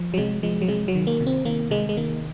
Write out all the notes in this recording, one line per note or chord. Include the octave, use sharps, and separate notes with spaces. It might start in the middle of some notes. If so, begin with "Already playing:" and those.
Already playing: F3
F#3
C3 G#3
F3 G#3
F#3
C3 G#3
F#3
D#3
A#3
C3
C4
D#3 A#3
C3 G#3
G#3
D#3 A#3